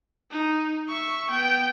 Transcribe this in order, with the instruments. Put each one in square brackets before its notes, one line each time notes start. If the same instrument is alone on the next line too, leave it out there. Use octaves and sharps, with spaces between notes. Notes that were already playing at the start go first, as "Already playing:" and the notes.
[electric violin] D#4
E5 C#6
B3 G5